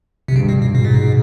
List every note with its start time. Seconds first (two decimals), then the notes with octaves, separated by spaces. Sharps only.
0.28 C3
0.36 G2 C#3
0.49 B2
0.62 B2
0.75 G#2 B2
0.85 A#2
0.95 B2